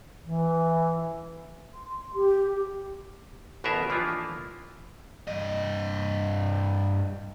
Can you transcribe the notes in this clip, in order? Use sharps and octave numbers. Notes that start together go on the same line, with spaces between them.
E3
C6
G4
A1 B2 B3 G#4 A#4 E5
E3 F3 A#3 D4 E4 F4
G2 D#5